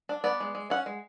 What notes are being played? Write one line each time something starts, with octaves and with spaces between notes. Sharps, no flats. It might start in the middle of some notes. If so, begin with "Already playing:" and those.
D4
B3 D5
G#3
G#3
C#4 F#5
G#3